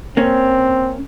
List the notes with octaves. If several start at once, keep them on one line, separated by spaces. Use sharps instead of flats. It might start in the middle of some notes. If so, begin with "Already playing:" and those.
A#3 C4 C#4